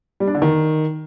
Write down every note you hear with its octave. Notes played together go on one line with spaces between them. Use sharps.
G3
D4
D3
D#3